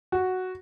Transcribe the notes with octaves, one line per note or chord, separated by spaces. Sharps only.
F#4